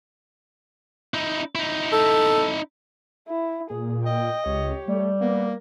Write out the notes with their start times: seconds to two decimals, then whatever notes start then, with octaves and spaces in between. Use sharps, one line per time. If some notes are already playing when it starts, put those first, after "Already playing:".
1.14 D#4 E4
1.55 D#4 E4
1.93 A4
3.28 E4
3.70 A#2 G#4
4.06 D#5 G5
4.45 C#2 G4 C#5
4.88 G3 A3
5.21 A#3 B3 A#4